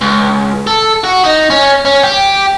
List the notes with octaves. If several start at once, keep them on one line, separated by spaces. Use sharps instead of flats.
C#2
A4
F#4
D#4
C#4
C#4
G4